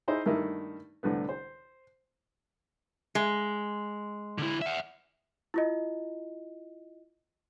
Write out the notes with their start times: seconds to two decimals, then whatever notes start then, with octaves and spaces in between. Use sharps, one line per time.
0.08 D#4 E4 G#4 C5 D#5
0.26 G2 D#3 A3 A#3 D#4 E4
1.03 C2 A2 D3 B3
1.29 C5
3.15 G#3
4.38 D3 E4
4.62 E5 F#5
5.54 E4 F4 D#5